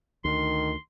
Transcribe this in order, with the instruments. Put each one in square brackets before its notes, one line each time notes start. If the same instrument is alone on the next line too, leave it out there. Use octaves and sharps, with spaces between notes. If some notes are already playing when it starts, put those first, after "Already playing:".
[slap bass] D2 [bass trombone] D#3 [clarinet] C6